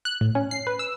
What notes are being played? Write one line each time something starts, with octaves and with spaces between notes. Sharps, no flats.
F#6
A2
C#4
C7
B4
E6